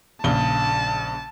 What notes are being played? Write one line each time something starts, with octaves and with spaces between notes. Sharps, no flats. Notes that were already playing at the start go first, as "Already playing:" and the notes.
A#1 C#3 A5 G7